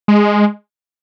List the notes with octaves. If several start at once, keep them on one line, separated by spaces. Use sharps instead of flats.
G#3